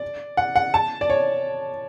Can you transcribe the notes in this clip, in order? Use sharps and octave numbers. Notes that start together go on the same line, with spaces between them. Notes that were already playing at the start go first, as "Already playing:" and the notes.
Already playing: D5
F#5
F#5
A5
D5
C#5